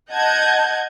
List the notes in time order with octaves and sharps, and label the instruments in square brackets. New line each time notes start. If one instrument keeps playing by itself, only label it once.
[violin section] D#5 F#5 A5 G6 G#6